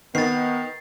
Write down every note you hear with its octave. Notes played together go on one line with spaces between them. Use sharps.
D#3 B3 A6 C7